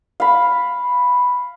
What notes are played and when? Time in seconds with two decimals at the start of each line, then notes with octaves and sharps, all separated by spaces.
0.20 F5 B5